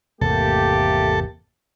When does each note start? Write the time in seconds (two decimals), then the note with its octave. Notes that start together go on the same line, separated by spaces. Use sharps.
0.21 G#1 E2 C3 A3 A#3 G4 A4